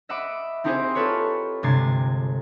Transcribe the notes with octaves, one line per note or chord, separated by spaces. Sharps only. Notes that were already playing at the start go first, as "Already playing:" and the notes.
D#5 E5 F#5 B5 D6
C4 D#4 E4 G4 G#4 C5
F4 A4 B4 C#5
G1 C3 G#3 G#6 A6 C7